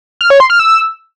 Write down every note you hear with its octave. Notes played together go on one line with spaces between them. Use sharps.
F6
C#5
C6
F6
E6